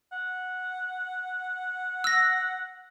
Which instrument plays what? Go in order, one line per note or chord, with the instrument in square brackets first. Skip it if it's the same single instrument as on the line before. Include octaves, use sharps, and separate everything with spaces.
[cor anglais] F#5
[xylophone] E6 A#6